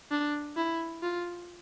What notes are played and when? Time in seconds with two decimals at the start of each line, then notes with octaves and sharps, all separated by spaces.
0.11 D4
0.56 E4
1.03 F4